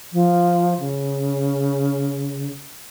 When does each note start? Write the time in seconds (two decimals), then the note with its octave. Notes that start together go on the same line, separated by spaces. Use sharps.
0.13 F3
0.80 C#3